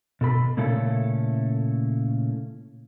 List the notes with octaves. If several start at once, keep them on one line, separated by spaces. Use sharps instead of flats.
B2 A4 B5
A#2 C#3 A3 C#4 E4 A4